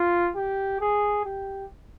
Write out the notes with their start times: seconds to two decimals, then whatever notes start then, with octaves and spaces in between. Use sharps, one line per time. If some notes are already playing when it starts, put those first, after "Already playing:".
Already playing: F4
0.36 G4
0.81 G#4
1.25 G4